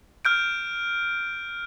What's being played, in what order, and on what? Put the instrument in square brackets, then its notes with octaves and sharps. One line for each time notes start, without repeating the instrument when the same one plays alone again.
[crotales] F6 G6 D7